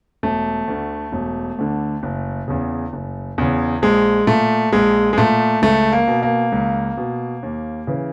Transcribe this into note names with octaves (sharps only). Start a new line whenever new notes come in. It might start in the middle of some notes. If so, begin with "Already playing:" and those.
E1 A3
D2 D3
E1
D2 D3
F#1
E2 C#3
F#1
E2 C#3
A#1 G#3
A#2 A3
A#1 G#3
G#3
A#2 A3
C#2 A3
A#3
B2
A#3
C#2
B2
D#2
C#3 E3